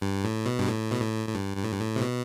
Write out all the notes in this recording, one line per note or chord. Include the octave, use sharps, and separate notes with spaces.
G2
A2
B2
G2
A2
B2
A2
A2
G2
G2
A2
G2
A2
C3
B2